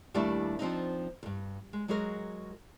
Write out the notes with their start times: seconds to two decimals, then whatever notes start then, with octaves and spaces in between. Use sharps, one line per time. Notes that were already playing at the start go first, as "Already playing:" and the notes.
0.14 D#2 G3 A3 D4 E4 D5
0.59 F3 C4 D4 D#4
1.23 E2 G2
1.73 G#3
1.88 F#3 G#3 F#4 G#4 A#4